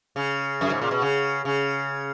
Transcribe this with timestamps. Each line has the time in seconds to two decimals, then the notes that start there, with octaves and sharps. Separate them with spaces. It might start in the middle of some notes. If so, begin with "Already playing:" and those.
0.16 C#3
0.61 F#2
0.70 G#2
0.81 A#2
0.91 B2
1.02 C#3
1.45 C#3